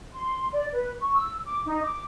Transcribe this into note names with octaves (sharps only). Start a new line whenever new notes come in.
C6
D5
B4
C#6
E6
D6
D#4
D6